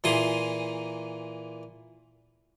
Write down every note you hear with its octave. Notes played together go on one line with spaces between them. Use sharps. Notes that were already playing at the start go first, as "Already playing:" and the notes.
A#2 E3 A#3 G#4 C6 D#6